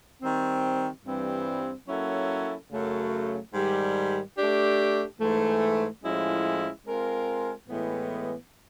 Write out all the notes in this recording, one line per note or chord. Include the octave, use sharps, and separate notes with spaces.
D#3 G3 C4
G2 E3 G3 C4
F#3 A#3 C#4 E4 A4
F#2 C#3 F#3 A3
G#2 D#3 G3
A3 D4 G4
G#2 E3 A3
A2 F3 G#3 C#4 E4
G#3 C4 F4 A#4
A2 E3 G#3 B3